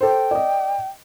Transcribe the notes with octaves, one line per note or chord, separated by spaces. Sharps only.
A4 C5 G5
D5 D#5